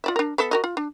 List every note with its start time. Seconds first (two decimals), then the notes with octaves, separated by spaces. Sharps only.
0.04 F4 D5 E5
0.16 D4 A#4
0.38 B3 A4 E5
0.51 F#4 A#4 D#5
0.64 F4
0.77 D4